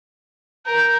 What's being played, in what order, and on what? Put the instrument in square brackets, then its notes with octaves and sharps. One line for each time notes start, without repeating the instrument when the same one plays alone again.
[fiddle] A#4 [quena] G6